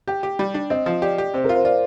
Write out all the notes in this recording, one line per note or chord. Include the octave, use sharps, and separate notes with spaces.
G4 G5
G4
G3
D4
C4 D#5
F3
G4 D5
G4
C3 C5
A#4
F4
C5
F4 D5